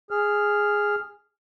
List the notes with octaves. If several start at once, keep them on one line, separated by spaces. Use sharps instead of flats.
G#4 F6